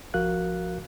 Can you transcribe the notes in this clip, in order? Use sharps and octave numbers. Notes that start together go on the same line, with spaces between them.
A#1 F3 F#4 A#4 F5 F#6